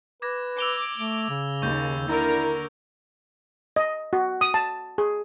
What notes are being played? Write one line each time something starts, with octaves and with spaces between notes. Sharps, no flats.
B4 D6 G#6 A#6
D6 E6 F7 G7
A3
C#3
D#2 C#6 G6
D3 E4 A#4
D#5
F#4
D#6
A5
G#4